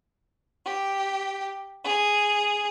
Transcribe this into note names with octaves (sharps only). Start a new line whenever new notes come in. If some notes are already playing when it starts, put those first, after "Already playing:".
G4
G#4